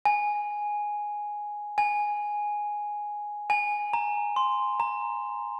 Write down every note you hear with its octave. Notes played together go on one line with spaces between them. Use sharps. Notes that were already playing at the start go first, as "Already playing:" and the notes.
G#5
G#5
G#5
A#5
C6
A#5